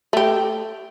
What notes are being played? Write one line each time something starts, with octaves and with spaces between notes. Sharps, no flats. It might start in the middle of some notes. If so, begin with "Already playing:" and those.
A3 G4